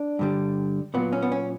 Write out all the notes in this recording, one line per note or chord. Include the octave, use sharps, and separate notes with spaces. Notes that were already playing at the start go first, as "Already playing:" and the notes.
Already playing: D4
G2 D3 G3
A#2 F#3 B3
C#4
B3
C#4